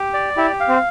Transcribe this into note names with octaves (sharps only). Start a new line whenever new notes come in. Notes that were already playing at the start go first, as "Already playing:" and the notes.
Already playing: G4
D5
E4 G4
F5
C4